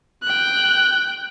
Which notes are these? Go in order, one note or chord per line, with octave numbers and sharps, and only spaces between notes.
G5 F#6